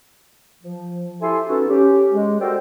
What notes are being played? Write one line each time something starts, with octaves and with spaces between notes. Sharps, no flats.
F3
E4 G4 A4 E5 G#5 C6
B3 C#4 D#4 F#4 A4
C#4 G4
G#3
F#4 A4 A#4 C5 D5 G5